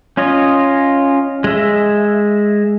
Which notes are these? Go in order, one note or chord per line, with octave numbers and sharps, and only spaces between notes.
C#4 F4 C#5 D#5
G#3 E5